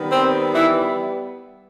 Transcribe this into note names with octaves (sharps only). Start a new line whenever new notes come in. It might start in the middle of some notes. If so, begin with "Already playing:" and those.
Already playing: D#3 G3 B3
C4
E3 E4